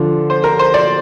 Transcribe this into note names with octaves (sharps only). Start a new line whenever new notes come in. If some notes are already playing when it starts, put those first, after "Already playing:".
Already playing: D3 F3 D4
C5
A#4
C5
D5